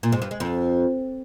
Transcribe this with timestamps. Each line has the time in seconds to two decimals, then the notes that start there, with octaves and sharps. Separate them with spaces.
0.03 A#2
0.12 G#2
0.22 G2
0.31 G#3
0.40 F2